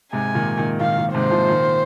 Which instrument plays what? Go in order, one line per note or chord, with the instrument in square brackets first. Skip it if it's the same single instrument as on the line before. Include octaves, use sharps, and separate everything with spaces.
[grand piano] G#2 C3 [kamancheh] G#5
[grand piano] A#2 D#3
A#2 D#3
[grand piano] A#2 D#3 [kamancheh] F5
[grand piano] A#2 D#3
[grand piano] G#2 C3 [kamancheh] C5
[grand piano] C3 F3
A#2 D#3